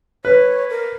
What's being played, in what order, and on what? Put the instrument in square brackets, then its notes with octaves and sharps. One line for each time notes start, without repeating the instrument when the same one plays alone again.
[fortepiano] B4 [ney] C#5
[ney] A#4